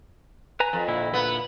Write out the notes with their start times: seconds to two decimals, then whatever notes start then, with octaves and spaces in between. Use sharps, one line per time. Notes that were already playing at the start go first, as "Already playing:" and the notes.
0.60 B4 G#5 A#5
0.73 F2
0.88 A#2 D3 E4
1.14 B3